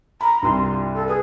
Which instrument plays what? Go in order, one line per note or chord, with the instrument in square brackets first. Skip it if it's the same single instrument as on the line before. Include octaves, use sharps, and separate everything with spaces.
[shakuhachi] A#5 [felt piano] B5
[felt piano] C2 G2 [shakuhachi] C6
[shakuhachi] F4
A4
[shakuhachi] G#4 [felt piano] B4